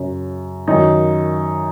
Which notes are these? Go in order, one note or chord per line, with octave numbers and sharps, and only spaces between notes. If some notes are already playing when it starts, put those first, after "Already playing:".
Already playing: F#2 C#3 F#3
F#2 D#3 F#3 D#4